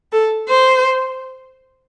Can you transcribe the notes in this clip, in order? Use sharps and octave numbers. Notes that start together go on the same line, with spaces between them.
A4
C5